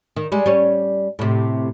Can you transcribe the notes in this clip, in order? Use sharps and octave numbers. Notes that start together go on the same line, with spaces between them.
D#3
G3 G#3
G3 C#4
A2 C3